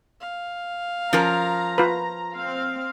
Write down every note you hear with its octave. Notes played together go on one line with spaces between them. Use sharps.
F5
F3 C#4 A#4 A#5
F4 B4
C4 F5